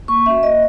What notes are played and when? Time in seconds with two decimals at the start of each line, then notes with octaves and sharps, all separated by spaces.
0.08 A#3 C#6
0.26 C#4 F#4 E5
0.43 A#3 D#5